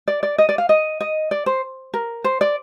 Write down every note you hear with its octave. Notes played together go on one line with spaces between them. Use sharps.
D5
D5
D#5
D5
F5
D#5
D#5
D5
C5
A#4
C5
D5